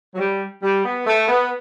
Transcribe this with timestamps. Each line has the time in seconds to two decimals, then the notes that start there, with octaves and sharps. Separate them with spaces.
0.13 F#3
0.19 G3
0.62 G3
0.85 B3
1.05 A3
1.27 B3